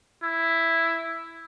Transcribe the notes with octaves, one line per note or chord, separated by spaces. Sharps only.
E4